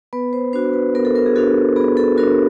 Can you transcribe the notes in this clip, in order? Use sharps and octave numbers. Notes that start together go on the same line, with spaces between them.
B3 B4
C5
D4 F#4 C5
B4
B3 A#4
A4
A#4
G#4
D4 F#4 A4
B3 G#4
A4
D4 F#4 A#4